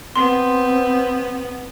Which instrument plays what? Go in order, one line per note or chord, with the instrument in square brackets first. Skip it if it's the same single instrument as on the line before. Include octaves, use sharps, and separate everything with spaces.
[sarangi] B3 [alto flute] C4 [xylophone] C6